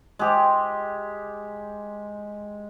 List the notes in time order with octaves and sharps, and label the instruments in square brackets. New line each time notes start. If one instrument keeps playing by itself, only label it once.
[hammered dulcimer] G#3 G4